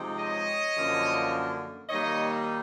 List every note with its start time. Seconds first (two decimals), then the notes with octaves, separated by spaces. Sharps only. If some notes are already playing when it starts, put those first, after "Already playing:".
Already playing: C3 F3 G#3 C4 D#4
0.19 C#5 D#5
0.77 F#2 D3 F3 A#3
1.89 D#3 G3 A#3 D#4 C#5 D#5